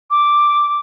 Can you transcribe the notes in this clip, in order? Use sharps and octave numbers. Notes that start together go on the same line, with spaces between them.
D6